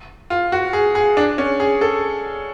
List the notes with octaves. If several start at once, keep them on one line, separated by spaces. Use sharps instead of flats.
F4
F#4
G#4
G#4
D4
C#4
G#4
A4